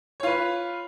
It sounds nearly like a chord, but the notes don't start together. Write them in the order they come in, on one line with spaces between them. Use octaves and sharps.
C#5 F4 B4